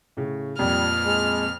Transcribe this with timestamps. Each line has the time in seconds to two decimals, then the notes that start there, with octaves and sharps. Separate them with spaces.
0.17 A2 C#3
0.59 F2 A#2 G3 F6
1.05 G#3